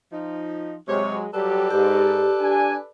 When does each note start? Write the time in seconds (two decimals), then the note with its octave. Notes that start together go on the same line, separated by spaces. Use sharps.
0.12 F3 D#4
0.88 C3 F#3 G#3 C#5
1.34 F#3 G3 G4 A4 B4 D5
1.70 G#2 G4
2.40 D4 G#5